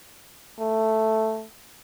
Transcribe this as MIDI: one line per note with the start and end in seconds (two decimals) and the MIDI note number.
0.60 1.45 57